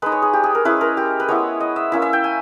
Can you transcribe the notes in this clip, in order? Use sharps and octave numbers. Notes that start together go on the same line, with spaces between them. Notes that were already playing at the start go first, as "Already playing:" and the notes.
G#3 D#4 B4
C#5
G#4
G4
G#4
A#4
G#3 C#4 E4 B4
A#4
G4
B4
G#3 B3 E4 C#5
D#5
E5
A#3 C#4 E4 E5
E5
G5
G#5